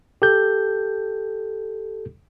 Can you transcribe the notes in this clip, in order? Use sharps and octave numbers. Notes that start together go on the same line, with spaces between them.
G4 A4 G6